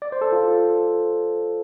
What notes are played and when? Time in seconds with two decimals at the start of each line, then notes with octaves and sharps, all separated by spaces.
0.02 D5
0.12 C5
0.21 A4
0.32 F4